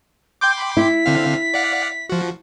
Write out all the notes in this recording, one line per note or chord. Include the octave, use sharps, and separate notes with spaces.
G5 C6 D6 G6
B5
E4 B6
D3 C4 F5
D5 F5 F#5
F3 F#4